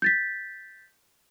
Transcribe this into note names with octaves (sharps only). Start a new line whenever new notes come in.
G6 A6 B6